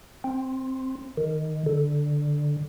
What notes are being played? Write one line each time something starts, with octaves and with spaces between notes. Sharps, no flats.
C4
D#3
D3